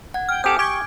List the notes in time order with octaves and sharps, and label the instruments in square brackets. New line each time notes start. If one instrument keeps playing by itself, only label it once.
[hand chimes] F#5 G#6
[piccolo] G5 [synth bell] F6
[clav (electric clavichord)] C4 G4 A4 [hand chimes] G#5 D#6 [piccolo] D6 [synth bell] G6
[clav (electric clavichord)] G4 [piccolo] C#6 [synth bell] D6 G#6 D7